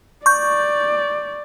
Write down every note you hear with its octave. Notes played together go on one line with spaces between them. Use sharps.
D5 C#6 G6